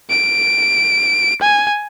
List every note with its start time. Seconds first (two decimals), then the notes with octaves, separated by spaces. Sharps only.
0.10 D7
1.41 G#5